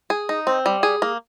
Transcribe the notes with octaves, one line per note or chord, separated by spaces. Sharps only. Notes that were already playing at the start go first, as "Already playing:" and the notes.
G#4
D#4
C4
G3
G#4
A#3